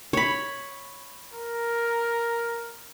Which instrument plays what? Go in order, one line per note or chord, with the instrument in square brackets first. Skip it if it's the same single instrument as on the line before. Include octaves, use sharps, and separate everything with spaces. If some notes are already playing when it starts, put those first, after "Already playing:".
[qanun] C#5 B5
[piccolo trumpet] A#4